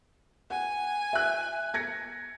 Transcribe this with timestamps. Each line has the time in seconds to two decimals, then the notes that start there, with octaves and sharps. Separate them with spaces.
0.50 F#5 G#5
1.13 E5 F#6
1.74 G#6 A#6 C#7